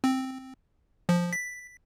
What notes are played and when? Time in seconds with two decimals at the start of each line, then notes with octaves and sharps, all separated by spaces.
0.04 C4
1.09 F3
1.33 B6